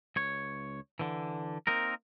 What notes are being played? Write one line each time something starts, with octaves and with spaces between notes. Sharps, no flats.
C#2 C#5
D3 E3
A#3 C4 D#4 A#4